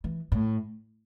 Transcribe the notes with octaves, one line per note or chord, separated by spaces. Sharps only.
E3
A2